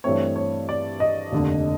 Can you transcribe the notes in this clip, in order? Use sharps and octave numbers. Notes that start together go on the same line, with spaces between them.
G2 E3 A3 C4 C#5
C#5
D5
D#5
F1 D#2 D3